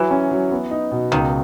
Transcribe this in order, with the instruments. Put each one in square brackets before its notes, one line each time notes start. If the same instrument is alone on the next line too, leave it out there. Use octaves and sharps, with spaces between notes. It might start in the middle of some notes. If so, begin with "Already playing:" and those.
Already playing: [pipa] E3 [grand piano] F#3
[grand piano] C#4
F#3
B3
D#4
B2
[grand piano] C#2 [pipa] D#3